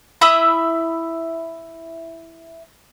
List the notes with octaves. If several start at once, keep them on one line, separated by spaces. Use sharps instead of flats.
E4 E5 B5 D#6